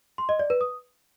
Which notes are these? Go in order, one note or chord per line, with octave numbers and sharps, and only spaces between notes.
C6
D#5
D5
B4
D#6